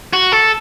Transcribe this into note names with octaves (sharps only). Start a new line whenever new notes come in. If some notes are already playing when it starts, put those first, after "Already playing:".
F#4
A4